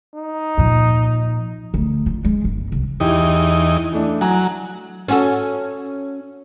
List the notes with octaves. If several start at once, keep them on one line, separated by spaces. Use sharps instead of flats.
D#4
A#2 F3
D2
F4
G#3
G1
C2
E2 D#4 E4 G4
E3 A3 D4
F#3 G#5 A#5
C#4 F#4 A4